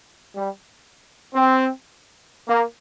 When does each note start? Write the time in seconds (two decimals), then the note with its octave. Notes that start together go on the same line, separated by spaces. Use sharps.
0.35 G3
1.34 C4
2.48 A#3